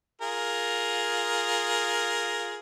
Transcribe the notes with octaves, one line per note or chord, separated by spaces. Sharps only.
F4 G#4 A#4